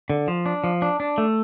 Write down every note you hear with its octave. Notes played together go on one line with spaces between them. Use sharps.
D3
F3
D4
F3
D4
D4
A3